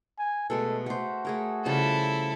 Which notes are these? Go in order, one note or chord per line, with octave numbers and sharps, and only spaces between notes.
G#5
B2 G#3 A3 A4
A3 F#4 C5
A3 G#4 A#4
C#3 F3 G3 E4 A4